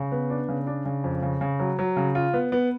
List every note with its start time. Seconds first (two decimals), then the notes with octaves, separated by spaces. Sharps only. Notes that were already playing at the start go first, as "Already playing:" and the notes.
Already playing: C#3
0.12 B3
0.30 D4
0.49 C#3
0.67 D4
0.85 C#3
1.04 F2
1.22 C#3
1.41 C#3
1.59 F#3
1.79 F#3
1.96 C#3
2.15 F4
2.34 B3
2.52 B3